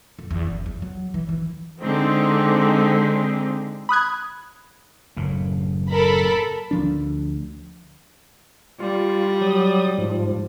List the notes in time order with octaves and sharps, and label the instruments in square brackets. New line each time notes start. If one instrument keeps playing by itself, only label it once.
[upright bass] F2
E2
F#1
E2
F#3
E3
E3
[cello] D3 G#3 [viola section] C4 D#4
[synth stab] B5 D#6 F#6 G#6
[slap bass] F#1 A2
[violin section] A4 A#4 B5
[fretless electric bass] D2 F3 D4
[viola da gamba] G3 [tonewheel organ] F4
[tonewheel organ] F#3 D#6
G#2 F3